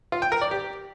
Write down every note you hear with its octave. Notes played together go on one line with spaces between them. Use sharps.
F4
G5
A#4
D5
G4